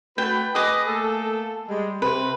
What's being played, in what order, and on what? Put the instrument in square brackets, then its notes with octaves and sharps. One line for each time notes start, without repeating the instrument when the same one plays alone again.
[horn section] A3 F#4 B4 [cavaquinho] G5
[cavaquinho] G#4 D6 [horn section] B4 D#5
[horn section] A3 A#3 A4
G3 G#3
[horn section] C3 [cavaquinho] B4